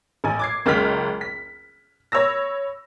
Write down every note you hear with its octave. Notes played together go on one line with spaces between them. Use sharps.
A1 G#5
D6 G#6 C7
F#1 C#2 G#3 F6 B6
B6
C#5 B5 E6 A#6